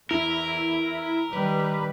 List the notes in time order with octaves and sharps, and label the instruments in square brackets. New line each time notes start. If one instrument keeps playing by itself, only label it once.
[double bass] E2 [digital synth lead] E4 [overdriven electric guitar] A#4
[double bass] D#3 G3 [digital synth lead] B4